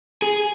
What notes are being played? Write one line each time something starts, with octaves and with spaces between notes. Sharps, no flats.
G#4